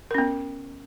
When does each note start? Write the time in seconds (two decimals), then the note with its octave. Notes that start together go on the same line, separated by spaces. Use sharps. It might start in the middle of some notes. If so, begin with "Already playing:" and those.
0.11 A#4
0.14 C#4
0.18 B3